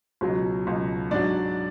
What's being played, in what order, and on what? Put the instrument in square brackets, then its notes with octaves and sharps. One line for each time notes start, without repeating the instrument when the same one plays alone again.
[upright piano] C#2 B2 F#3
C#2 B2 F#3
G#2 F#3 D4 D5